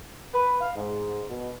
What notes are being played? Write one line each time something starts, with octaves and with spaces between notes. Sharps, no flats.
B4
F5
G#2
B2